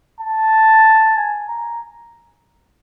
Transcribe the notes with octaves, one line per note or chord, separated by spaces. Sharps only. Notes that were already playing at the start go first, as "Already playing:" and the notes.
A5
G#5
A#5